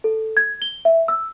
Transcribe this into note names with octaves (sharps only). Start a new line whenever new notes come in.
A4
G#6
G7
E5
E6